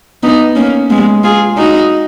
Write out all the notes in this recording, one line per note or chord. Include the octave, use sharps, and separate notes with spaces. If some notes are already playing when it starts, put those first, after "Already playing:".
B3 D#4
A#3 C#4
G#3 B3
F4 G#4
D#4 F#4